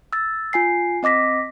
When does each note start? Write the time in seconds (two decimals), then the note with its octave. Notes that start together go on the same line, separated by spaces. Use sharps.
0.13 E6 A6
0.53 F4 G#5 C7
1.03 C4 D#5 D6 A#6 B6